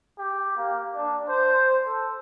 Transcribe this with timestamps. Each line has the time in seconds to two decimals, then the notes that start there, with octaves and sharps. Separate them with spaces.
0.18 G4
0.57 A#3
0.95 D4
1.28 C5
1.85 A4